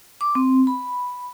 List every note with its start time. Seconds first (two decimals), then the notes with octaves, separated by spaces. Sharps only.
0.21 D6
0.35 C4
0.67 B5